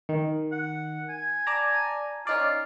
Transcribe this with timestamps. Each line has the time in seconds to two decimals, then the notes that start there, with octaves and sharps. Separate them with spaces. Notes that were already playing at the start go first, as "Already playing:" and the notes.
0.09 D#3
0.52 F#5
1.09 G#5
1.47 D5 A5 A#5
2.27 C#4 D#4 F4 D5